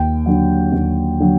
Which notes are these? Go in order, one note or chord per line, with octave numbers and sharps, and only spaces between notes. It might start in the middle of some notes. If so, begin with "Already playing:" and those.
Already playing: D#2 G5
D3 F#3
D#2
D3 F#3